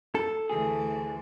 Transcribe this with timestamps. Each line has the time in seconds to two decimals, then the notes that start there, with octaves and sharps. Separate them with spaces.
0.15 A4
0.50 D2 E3 G#4